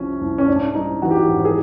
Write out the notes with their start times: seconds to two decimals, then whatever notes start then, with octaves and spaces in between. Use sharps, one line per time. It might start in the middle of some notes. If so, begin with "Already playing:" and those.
Already playing: C2 C3 F3 C#4
0.21 C2
0.38 C#4
0.48 G#2 D4
0.75 G3 D#4
1.02 E3 F#4
1.11 G4
1.18 F#4
1.29 G#1
1.45 G#4